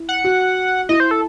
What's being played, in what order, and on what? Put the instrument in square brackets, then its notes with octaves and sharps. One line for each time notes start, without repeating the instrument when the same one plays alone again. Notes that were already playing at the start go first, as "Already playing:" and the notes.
Already playing: [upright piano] E4
[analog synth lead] F#5
[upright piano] F#4
[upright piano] E4 [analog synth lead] D#5
[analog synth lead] C5
A4